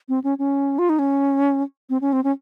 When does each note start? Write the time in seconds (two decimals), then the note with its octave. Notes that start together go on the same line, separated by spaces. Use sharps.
0.09 C4
0.24 C#4
0.39 C#4
0.79 F4
0.89 D#4
0.99 C#4
1.90 C4
2.01 C#4
2.13 C4
2.24 C#4